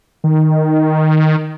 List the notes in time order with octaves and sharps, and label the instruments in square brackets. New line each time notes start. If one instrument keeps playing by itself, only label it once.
[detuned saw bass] D#3